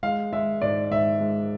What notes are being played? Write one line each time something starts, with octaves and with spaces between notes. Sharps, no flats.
G#3 F5
G#3 E5
G#2 D5
G#2 E5
G#3